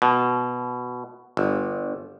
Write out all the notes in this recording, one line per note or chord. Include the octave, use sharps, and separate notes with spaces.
B2
G1